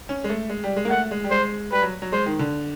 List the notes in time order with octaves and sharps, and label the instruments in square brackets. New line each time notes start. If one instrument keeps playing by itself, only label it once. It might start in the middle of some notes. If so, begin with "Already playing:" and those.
[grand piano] C#4
G#3
A3
G#3
G3
G#3
A#3
[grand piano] A3 [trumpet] F#5
[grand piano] G#3
G3
[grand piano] G#3 [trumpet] C5
[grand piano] G3 [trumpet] B4
[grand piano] F#3
F#3
[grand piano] G#3 [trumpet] C5
[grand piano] D#3
D3